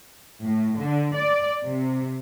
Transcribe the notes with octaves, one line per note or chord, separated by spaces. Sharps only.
A2
D3
D5
C3